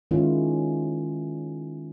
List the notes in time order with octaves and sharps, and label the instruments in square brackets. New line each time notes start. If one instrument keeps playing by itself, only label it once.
[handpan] D#3 G#3 C#4 E4 F4